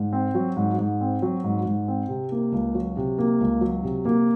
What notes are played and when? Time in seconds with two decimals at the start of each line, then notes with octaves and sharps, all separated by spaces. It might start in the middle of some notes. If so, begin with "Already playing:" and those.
Already playing: G#2
0.13 C4
0.35 F#3
0.57 G#2
0.78 G#2
1.01 C4
1.22 F#3
1.44 G#2
1.66 G#2
1.88 C4
2.09 C3
2.32 A#3
2.52 C#2
2.75 F#3
2.97 C3
3.18 A#3
3.40 C#2
3.61 F#3
3.83 C3
4.05 A#3